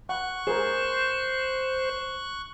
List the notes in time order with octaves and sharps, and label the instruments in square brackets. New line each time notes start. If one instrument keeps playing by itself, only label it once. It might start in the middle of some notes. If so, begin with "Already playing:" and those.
[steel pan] F#5 [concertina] C#6 F#6
[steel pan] G#4 A#4 [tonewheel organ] C5